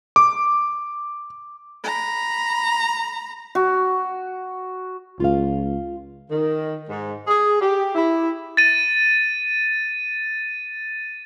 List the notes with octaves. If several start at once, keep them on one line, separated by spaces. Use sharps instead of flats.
D6
A#5 B5
F#4
C#2 F4 F5
D#3
G#2
G#4
G4
E4
A6 D#7